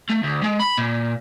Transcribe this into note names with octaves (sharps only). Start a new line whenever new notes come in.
A3
D2
G#3
B5
A#2